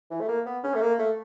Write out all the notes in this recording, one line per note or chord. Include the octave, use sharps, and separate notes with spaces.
E3
A3
A#3
B3
C#4
A3
A#3
A3